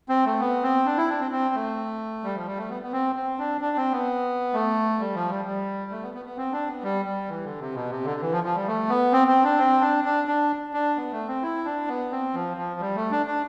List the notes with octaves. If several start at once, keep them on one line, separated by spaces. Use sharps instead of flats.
C4
A3
B3
C4
D4
E4
D4
C4
C4
A3
G3
F3
G3
A3
B3
B3
C4
C4
D4
D4
C4
B3
A3
G3
F3
G3
G3
A3
B3
B3
B3
C4
D4
B3
G3
G3
E3
D3
C3
B2
C3
D3
E3
F3
F3
G3
A3
B3
C4
C4
D4
C4
D4
D4
D4
D4
B3
A3
C4
E4
D4
B3
C4
F3
F3
G3
A3
D4
D4